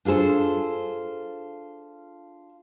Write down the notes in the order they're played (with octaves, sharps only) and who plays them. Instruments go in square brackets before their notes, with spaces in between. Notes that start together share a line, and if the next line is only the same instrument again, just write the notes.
[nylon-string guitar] D4 F4 G#4 A4 C5